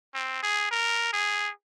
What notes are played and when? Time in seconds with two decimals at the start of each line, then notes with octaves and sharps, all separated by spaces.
0.14 C4
0.43 G#4
0.71 A#4
1.13 G#4